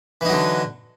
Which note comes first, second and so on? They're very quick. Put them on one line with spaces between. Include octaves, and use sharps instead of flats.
E3 D#4 F#3 D3